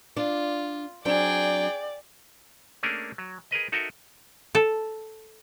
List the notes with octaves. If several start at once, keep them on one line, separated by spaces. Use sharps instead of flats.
D4 F4 D5
F#3 C4 D4 G#4 D5 G5
A3 A#3 C#4 D4 G#4 A#4
F#3
G#4 A#4 B4 D#5
D#4 F#4 A4 A#4 D#5 E5
A4